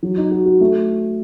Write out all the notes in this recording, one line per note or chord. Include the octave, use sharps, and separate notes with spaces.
F#3
D#4
F#4
F#4
A3